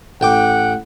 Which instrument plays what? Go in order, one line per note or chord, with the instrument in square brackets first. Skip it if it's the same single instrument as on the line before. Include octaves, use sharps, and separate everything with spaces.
[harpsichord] A1 G5 D6 [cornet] F#5